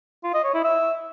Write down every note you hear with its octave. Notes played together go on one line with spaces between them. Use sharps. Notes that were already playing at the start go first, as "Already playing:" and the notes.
F4
D#5
C#5
E4
E5